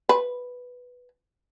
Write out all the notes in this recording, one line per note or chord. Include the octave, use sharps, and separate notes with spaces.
B4